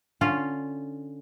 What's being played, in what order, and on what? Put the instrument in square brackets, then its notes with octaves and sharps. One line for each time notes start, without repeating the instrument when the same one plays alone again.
[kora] D3 C#4 F4